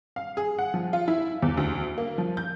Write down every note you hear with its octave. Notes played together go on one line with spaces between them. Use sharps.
F5
G#4
F#5
F3
F4
E4
E2
D2
A#3
F3
G6